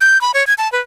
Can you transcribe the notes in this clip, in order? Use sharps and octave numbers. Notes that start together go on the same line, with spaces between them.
G6
B5
C#5
G#6
A5
B4